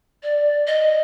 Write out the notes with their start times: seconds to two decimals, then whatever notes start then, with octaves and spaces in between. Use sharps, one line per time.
0.23 D5
0.67 D#5